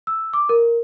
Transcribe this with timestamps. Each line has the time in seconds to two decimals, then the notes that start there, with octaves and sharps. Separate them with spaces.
0.07 E6
0.33 D6
0.49 A#4